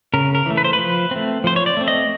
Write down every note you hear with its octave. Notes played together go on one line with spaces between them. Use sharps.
C#3 A#4
A#4
E3 A3
B4
C5
B4
F3
A3 C4
F3 C5
C#5
D5
A3 C4
D#5